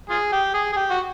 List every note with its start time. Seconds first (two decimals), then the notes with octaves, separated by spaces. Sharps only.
0.10 F4 G#4
0.32 G4
0.54 G#4
0.73 G#4
0.76 G4
0.90 F#4